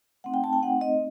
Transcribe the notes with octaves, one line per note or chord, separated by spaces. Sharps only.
A3 C4 D#4 F#5
G5
A5
G5
A3 C4 D#4 F#5
D#5